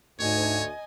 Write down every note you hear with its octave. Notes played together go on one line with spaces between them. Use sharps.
D2 G#2 C#5 D#5 G#5